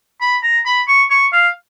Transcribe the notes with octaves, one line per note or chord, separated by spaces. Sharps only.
B5
A#5
B5
C#6
C#6
F5